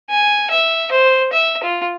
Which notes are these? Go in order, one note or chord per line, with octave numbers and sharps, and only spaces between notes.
G#5
E5
C5
E5
F4